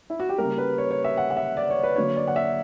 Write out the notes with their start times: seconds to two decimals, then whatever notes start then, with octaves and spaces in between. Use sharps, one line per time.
0.10 E4
0.20 F#4
0.29 G4
0.38 C#3 G3 A#3 A#4
0.58 B4
0.78 C#5
0.91 C#5
1.04 E5
1.17 F#5
1.30 F#5
1.37 E5
1.57 D5
1.70 C#5
1.83 B4
1.96 D3 F#3 A#3 C#5
2.16 D5
2.27 F#5
2.36 E5